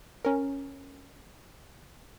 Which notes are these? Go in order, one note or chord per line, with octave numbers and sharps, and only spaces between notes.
C#4 A#4